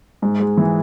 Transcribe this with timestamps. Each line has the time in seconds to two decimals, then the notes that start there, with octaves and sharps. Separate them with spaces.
0.22 G#2
0.40 G#3
0.57 E3